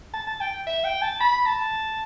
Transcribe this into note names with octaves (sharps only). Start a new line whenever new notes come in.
A5
A5
G5
E5
G5
A5
B5
A5